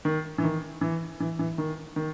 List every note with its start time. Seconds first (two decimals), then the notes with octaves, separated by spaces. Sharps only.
0.05 D#3
0.38 E3
0.44 D#3
0.81 E3
1.20 E3
1.39 E3
1.58 D#3
1.96 D#3